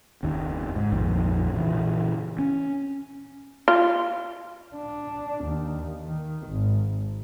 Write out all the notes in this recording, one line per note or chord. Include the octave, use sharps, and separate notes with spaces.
F#1 D#2 D#3
G#2
A#1 F2 D#3
A#2 C#3 E3
C#4
F4
D4
D#2
D#3
G#1